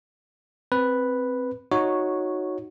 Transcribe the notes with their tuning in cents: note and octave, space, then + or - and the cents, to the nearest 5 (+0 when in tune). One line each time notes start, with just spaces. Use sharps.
C4 +0 B4 +0
D#4 +0 F#4 -10 C#5 +0